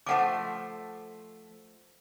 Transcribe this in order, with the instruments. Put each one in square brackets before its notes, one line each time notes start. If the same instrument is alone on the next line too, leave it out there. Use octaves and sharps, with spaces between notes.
[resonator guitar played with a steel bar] F3 A3 C5 [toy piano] F#5 D6